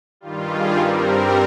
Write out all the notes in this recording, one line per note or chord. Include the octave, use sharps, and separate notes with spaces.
G2 D#3 G3 F4
G#4
G2 G3 C4 A#4